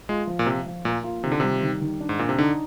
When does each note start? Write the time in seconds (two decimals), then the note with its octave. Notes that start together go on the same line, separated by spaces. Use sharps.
0.09 G#3 F4
0.27 F3
0.39 A#2
0.47 C3 F3
0.65 F3
0.85 A#2 A#3
1.04 F4
1.24 C3 D#3
1.32 D3
1.40 C3 G3
1.62 D#3
1.81 D#3
2.00 D4
2.09 G#2
2.19 A#2 D4
2.29 C3
2.38 D3 D#4